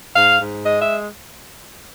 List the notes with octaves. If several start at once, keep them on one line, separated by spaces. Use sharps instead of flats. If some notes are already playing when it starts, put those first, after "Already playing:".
G#2 F5
G#2
G#3 D#5
E5